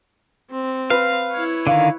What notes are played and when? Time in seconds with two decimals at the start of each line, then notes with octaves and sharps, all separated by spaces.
0.51 C4
0.90 B4 F5
1.32 E4 C#5
1.67 D3 D#3 F5